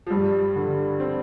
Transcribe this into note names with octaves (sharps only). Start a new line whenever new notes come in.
F3
G2 G3
D3
C4